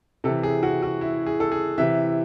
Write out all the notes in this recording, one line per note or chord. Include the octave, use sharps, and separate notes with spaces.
C3 E3 A4
G#4
F#4
F#4
E4
G#4
A4
G#4
C3 E3 E5